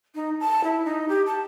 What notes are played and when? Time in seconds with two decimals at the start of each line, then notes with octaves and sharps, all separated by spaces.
0.15 D#4
0.40 A5
0.64 E4
0.85 D#4
1.09 G4
1.26 A5